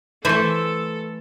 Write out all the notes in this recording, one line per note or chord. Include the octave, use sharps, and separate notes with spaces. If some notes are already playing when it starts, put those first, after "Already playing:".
E3 A3 A4 C5 G#5 B5